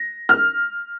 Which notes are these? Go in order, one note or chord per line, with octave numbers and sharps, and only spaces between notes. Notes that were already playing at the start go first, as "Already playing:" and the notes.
Already playing: A#6
F6